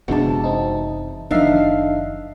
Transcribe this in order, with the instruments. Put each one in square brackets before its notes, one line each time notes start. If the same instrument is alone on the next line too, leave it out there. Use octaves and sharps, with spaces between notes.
[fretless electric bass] F#1 C3 D4 [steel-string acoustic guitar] E2 A5 [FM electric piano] G#3 B3 F#4
[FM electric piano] C4 D#4
[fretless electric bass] F#1 F3 [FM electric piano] D#3 E5 C7 [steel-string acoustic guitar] D4 D#4 F5